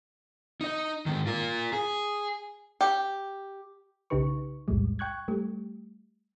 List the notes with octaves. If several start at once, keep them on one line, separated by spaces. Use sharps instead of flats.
D#4 D#5
G#2 D#3
F4 A#4
G#4
G4
B1 C#3 D#4 G4 B4 C#6
B1 E2 A2 G3 G#3
G5 C#6 F#6 G#6
G3 A3 G4